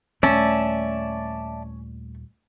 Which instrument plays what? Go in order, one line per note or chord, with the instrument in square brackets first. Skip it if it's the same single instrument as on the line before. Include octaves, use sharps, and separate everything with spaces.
[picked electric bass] D#1 [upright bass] A3 [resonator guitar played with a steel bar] C#4 [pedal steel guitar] D5 E5 A5